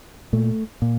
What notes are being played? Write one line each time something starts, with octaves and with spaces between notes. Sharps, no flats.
A#2 A3
A#2